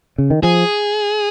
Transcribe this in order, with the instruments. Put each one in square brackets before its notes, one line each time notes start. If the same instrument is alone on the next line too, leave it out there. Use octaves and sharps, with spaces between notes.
[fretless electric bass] C#3
D#3
[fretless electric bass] F3 [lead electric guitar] G#4